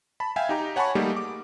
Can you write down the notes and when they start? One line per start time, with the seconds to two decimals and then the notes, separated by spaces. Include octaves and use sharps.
0.20 A5 B5
0.36 E5 F5 G5 G#5
0.49 D#4 G4 A#5
0.76 C#5 F#5 G#5 A5 B5 C#6
0.95 G3 A3 A#3 D#4 G4 G#4
1.16 D6